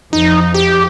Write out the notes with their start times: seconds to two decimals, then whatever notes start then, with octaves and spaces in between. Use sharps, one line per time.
0.13 F2 D#4
0.54 G4